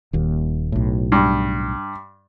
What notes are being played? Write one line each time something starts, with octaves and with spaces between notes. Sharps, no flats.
D#1 D#2
B1 A2
G2